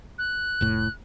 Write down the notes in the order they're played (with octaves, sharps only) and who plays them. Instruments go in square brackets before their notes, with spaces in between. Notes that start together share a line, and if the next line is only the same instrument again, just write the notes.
[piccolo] F#6
[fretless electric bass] F1 A2